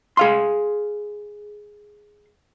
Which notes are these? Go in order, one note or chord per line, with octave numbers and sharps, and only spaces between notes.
G#4 F5 C6